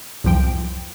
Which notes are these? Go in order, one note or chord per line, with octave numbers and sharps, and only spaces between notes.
C2 F2 F3 G5